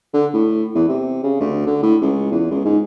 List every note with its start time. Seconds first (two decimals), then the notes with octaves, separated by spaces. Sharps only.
0.14 D3
0.34 A2
0.75 E2
0.88 C3
1.23 C#3
1.40 D2
1.66 D3
1.83 A2
2.01 C#2
2.31 E2
2.51 C#2
2.65 G#2